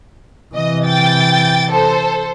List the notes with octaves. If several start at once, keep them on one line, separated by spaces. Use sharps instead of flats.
C3 E3 D#5
G5 A6
A4 C5